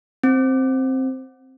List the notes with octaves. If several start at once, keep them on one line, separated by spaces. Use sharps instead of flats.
C4